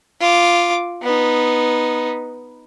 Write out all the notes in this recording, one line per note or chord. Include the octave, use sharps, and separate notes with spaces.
F4 D6
B3 D#4